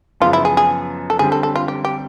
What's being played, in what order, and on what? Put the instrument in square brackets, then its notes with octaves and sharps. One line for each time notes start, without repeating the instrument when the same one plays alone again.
[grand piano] F#2 C#3 F3 G#3 B3 [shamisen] F4
[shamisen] E4
G#4
G#4
A4
[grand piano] D3 G3 C4 [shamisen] G#4
[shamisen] A4
A4
F4
G4
G4